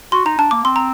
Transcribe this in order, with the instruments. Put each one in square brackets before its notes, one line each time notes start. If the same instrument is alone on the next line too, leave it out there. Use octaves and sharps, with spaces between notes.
[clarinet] F#4 [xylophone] C6
[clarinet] D#4 [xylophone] A#5
[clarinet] D4 [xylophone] A5
[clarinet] A#3 [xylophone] D6
[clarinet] C4 [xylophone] C6
[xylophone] A#5